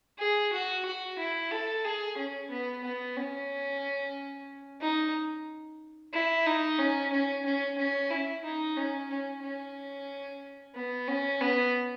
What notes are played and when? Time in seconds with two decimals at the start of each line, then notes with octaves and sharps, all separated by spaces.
0.19 G#4
0.53 F#4
0.85 F#4
1.18 E4
1.51 A4
1.84 G#4
2.17 C#4
2.51 B3
2.84 B3
3.16 C#4
4.81 D#4
6.14 E4
6.46 D#4
6.79 C#4
7.12 C#4
7.45 C#4
7.78 C#4
8.11 E4
8.44 D#4
8.77 C#4
9.10 C#4
9.43 C#4
10.75 B3
11.08 C#4
11.41 B3